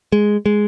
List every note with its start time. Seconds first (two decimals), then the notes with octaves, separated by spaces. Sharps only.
0.12 G#3
0.46 G#3